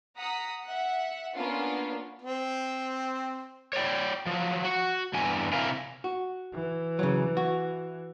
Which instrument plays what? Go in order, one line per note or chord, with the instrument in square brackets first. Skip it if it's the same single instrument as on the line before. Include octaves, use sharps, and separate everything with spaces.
[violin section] F#5 A#5 D#6 B6
E5 F#5
A#3 B3 C#4 D4 F4
[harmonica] C4
[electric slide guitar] C#5 D5 G5
F3 F#3
F#4
E2 G2 G#5
C3 E4 A#4 F5 G#5
[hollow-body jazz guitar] F#4
[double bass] E3
[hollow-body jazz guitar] C#3 F#3
F#4